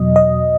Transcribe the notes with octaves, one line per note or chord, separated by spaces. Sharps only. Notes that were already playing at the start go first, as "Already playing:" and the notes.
Already playing: E2 B2 F#3 D#5
D#5